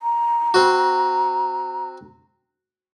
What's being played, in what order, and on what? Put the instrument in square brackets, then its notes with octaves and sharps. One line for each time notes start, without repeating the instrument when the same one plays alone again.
[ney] A#5
[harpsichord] C4 F#4